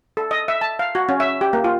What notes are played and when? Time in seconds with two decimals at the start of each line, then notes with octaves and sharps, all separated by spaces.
0.17 A4
0.31 D#5
0.48 E5
0.61 A5
0.79 F5
0.95 F#4
1.09 C#4
1.20 E5
1.41 G4
1.53 A#3
1.64 F4